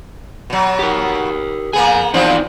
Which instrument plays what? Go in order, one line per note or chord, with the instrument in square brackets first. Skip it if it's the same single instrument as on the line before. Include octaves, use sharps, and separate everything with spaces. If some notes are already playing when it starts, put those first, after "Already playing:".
[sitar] B2 F#3
[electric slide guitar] G4 A#4
[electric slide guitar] F2 G#5 [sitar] A#3 B3 G#4
[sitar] E3 F3 C4 [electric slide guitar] D#4 C5 D5